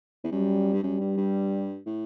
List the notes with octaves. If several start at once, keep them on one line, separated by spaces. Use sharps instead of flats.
E2
F#2 G3
G2
F#2 G3
G2
G2
A2